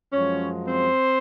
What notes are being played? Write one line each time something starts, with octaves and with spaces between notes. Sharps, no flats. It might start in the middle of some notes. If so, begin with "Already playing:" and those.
F#2 F3 G#3 C#4 C#5
C4 C5